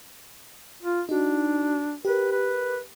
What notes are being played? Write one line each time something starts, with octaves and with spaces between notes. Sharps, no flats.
F4
D4 D#4 F#4
G4 A#4 B4
B4